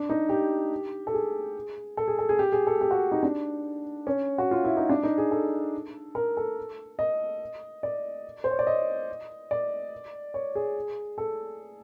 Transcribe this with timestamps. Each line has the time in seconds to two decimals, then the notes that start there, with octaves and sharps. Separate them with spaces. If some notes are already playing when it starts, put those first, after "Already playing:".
Already playing: D4
0.09 D#4
0.29 G4
1.07 A4
1.14 G#4
1.97 A4
2.08 G#4
2.19 A4
2.29 G#4
2.39 G4
2.52 G#4
2.67 A4
2.81 G4
2.91 F#4
3.12 D#4
3.23 D4
4.07 C#4
4.38 F#4
4.51 F4
4.65 E4
4.77 D#4
4.89 D4
5.03 D#4
5.18 G#4
5.31 A4
6.15 A#4
6.37 A4
6.99 D#5
7.83 D5
8.44 C5
8.51 C#5
8.59 D5
8.67 D#5
9.51 D5
10.34 C#5
10.55 G#4
11.18 A4